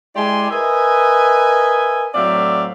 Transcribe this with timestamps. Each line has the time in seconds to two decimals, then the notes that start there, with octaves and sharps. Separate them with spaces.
0.16 G#3 E4 G4 D5 G#5 C6
0.51 A#4 B4 D#5 E5 G#5
2.14 A2 F#3 C4 D5 E5 F5